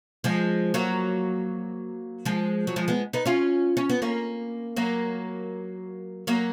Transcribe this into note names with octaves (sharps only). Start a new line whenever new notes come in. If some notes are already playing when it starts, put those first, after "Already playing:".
F3 G#3
F#3 A#3
F3 G#3
F#3
F3 G#3
G#3 B3
B3 D#4
C#4 F4
C#4
B3
A#3 C#4
F#3 A#3
F#3 A#3